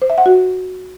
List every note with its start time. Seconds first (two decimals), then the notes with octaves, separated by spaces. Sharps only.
0.02 C5
0.10 E5
0.18 F#5
0.26 F#4